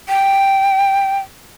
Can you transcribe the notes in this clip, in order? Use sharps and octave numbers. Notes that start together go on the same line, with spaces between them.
G5